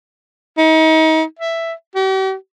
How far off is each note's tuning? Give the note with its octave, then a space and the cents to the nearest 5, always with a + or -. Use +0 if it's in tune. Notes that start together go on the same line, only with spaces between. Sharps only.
D#4 +35
E5 +5
G4 -45